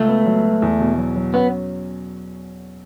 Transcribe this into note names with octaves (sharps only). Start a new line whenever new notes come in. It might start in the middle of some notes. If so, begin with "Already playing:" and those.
Already playing: C#2 A3
B3
F#3
F#3
E2
B2
F#3
F#3
B3 C#4